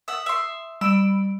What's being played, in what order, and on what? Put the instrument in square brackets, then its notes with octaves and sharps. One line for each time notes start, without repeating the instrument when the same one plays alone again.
[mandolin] E5 F#5 [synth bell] D#6
[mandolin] E5 C6
[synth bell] G3 B5 D7 [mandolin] E6